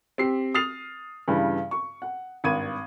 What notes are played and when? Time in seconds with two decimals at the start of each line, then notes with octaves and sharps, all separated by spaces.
0.18 C4 G4 C7
0.55 D#6 F6 A6 C7 F7
1.28 G2 C#3 E3 G3
1.71 C#6
2.02 F#5
2.44 G#1 G2 G#6 D#7